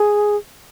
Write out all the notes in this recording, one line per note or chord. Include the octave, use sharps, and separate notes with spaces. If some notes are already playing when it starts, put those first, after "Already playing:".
Already playing: G#4